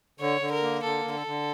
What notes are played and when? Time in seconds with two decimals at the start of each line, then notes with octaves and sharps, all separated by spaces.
0.20 D3 C#5
0.41 D3
0.52 A#4
0.62 A#3
0.84 D3 A4
1.05 D3
1.16 A4
1.27 D3